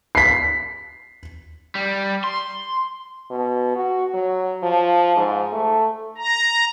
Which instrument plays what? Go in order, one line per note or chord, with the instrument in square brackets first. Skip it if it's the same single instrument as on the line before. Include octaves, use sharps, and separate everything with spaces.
[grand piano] B6 C7
[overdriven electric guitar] G3
C6
[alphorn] B2
F#4
F#3
F3
G#2
A3
[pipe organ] A#5